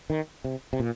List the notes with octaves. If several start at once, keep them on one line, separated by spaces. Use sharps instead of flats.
D#3
C3
C3
A#2